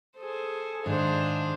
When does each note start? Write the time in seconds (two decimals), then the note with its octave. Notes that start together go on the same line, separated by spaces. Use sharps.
0.18 G#4 A4 C5
0.86 G#2 D#3 D4 G#4 C5 F5